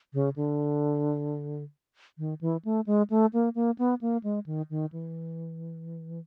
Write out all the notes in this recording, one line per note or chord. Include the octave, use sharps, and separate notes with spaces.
C#3
D3
D#3
E3
A3
G#3
A3
A#3
A#3
B3
A#3
G#3
D#3
D#3
E3